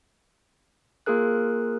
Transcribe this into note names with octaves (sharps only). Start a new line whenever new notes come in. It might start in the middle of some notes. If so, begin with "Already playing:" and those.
A#3 F4 G#4 A#4 F#6